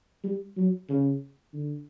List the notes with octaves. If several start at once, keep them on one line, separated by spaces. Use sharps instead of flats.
G3
F#3
C#3
D3